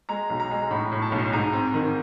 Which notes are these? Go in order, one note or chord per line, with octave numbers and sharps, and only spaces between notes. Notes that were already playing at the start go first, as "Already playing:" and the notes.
G#3 A#5
B1
A#5
G#3
A2 B5
A2
A5
B1
G#2 A#5
C4
D#3